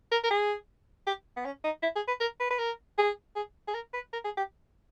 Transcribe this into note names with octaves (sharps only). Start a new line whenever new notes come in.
A#4
A#4
G#4
G4
B3
C#4
D#4
E4
G#4
B4
A#4
B4
B4
A#4
G#4
G#4
G#4
A#4
B4
A#4
G#4
G4